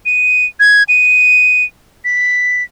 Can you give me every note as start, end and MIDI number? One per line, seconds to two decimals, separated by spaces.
0.06 0.45 99
0.60 0.83 92
0.89 1.64 99
2.05 2.63 95